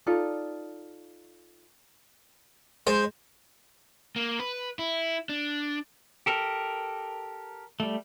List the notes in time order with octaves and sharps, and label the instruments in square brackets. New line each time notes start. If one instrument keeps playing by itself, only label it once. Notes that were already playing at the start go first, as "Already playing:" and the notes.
[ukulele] D#4 F4 A4 D5
[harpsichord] G#3 [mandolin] C5
[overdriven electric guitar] A#3
B4
E4
D4
[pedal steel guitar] G4 A4 A#4
G3 A3